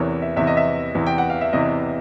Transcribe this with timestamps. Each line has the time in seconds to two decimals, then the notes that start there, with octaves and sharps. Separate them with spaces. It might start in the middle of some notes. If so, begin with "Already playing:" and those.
Already playing: E2 C3 E3 A#4 C#5
0.22 E5
0.36 E2 C3 E3 E5
0.47 D#5
0.57 E5
0.95 E2 C3 E3
1.07 G5
1.18 F#5
1.30 F5
1.41 E5
1.53 E2 C3 E3 D#5